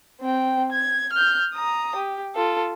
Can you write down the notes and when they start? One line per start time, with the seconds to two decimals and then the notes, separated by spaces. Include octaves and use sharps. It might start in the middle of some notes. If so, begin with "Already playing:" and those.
0.21 C4 G5
0.72 G#6
1.13 F6 G6
1.54 A#5 D#6
1.96 G4
2.35 F4 A4